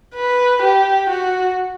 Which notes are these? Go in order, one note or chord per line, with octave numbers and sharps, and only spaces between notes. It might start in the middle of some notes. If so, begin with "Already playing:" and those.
B4
G4
F#4